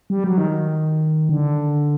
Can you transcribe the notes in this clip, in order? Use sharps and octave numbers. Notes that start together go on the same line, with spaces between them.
G3
F#3
D#3
D3